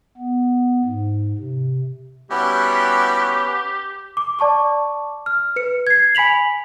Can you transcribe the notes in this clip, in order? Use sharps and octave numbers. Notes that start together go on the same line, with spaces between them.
B3
G#2
C3
G3 B3 C#4 E4 F#4 G4
D6
D5 A5 C#6 D6
F6
B4 C#7
G#6 C7
G#5 B5 B6 F7 F#7